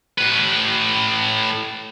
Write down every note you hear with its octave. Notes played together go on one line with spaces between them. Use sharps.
A2 B4